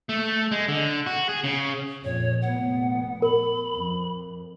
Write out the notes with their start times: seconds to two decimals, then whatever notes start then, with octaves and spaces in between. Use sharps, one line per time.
0.09 A3
0.51 G#3
0.69 D3
1.06 F#4
1.29 G#4
1.44 C#3
2.04 F2 A#2 C#5
2.42 F1 A#2 B3 F#5
3.22 A#4 B5
3.75 F2